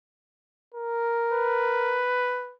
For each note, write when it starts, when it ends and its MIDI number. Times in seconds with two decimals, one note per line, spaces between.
0.74 2.02 70
1.32 2.54 71